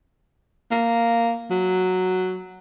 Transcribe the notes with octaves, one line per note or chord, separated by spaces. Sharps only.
A#3
F#3